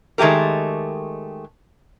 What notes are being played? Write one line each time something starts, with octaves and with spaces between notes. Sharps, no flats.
D#3 G#3 A3 G4 A#4